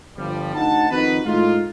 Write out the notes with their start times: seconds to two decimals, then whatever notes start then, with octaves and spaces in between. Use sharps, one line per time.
0.16 G1 F3 G3
0.54 D2 D#4 F#5 A5
0.90 F2 D#3 C4 D#4 F#4 B4
1.24 A2 G#3 A3 D#4 F4